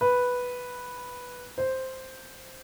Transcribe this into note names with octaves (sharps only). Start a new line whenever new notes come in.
B4
C5